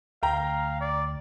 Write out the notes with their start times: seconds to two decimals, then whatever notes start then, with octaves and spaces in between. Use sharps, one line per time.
0.23 D2 F5 G5 A#5
0.81 D5